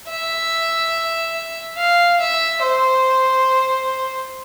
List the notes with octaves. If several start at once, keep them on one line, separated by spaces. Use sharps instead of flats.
E5
F5
E5
C5